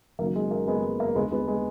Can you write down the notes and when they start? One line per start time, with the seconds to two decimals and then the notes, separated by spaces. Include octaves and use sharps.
0.19 F#1 F#2 D#3 A#3
0.35 G#3
0.51 A#3
0.67 G#3 B3
0.83 G#3
1.00 A#3
1.15 D#2 D3 G#3 B3
1.31 G#3 B3
1.48 G#3